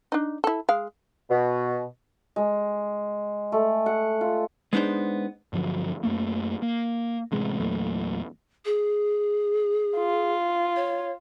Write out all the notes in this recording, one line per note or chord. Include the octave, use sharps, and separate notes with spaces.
D4 D#4
E4 A4
G#3 F5
B2
G#3
A3
F#5
F4
G#3 B3 D4 D#4 C5
G2 D3 F3 F#3
F#2 A3 A#3
A#3
A1 C3 G#3
E2 A#2 F#3 A3
G#4
F4
C#5